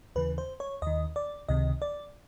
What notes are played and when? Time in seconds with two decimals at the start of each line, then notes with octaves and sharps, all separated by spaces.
0.15 D#2 C#3 E3 B4
0.38 C5
0.60 C#5
0.82 D#2 D#3 D#5
1.16 D5
1.49 C#2 C3 D#3 D#5
1.82 D5